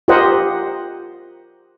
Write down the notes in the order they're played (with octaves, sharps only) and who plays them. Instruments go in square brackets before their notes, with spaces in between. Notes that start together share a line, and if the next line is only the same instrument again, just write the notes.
[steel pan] F4 G4 A#4 C5 D#5 F#5